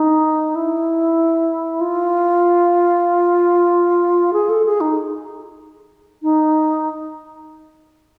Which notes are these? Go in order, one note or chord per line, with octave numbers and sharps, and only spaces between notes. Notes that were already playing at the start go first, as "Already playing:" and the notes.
Already playing: D#4
E4
F4
G#4
A4
G#4
D#4
D#4